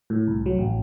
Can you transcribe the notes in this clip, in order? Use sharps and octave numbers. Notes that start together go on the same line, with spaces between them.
A2
C2
F#3
A1